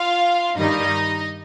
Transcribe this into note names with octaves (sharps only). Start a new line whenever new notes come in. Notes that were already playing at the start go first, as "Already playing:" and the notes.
Already playing: F4 F5
G2 D#3 G3 D#4 D#5